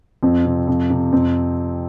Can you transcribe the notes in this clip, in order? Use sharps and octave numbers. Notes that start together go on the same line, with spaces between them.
F2 C4
C3
F2
C3
F2 C4